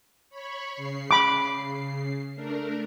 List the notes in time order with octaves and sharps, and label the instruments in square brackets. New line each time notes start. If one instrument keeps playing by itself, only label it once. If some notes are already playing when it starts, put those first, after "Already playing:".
[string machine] C#5 B5 C#6
C#3 C7
[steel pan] B5 D6
[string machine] A3 D4 A#4